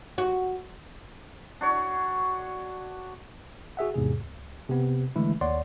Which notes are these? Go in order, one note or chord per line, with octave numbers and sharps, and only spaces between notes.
F#4
D4 F#4 C#5
F#4 G#4 E5 F#5
E2 G#2 C3 G#4
C#2
C3 B3
D3 E3 G#3 A3 E4
D#2 C#5 D5 F#5 C6